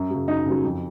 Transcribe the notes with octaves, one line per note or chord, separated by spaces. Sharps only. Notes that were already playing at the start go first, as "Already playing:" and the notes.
Already playing: F#2
C#3 F#3
F#2 D#4
C#3 F#3
F2